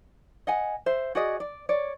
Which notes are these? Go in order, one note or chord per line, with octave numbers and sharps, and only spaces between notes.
D#5 F#5 G#5
C5 E5
F#4 G#4 D5 D#5
D5
C#5 D5